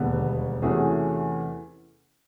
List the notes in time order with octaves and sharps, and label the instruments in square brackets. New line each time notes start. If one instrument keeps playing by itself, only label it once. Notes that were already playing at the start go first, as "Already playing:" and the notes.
Already playing: [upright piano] E1 D#2 D3 G3 B3
E2 C3 E3 A3 C#4 F#4 G#4